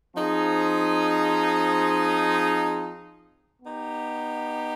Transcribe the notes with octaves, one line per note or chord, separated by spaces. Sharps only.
F3 C4 D#4 G#4
B3 D#4 G4